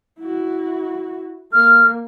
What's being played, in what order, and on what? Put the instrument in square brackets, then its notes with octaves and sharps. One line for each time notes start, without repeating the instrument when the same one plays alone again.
[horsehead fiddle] E4 F#4
[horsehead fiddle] A#3 [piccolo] F6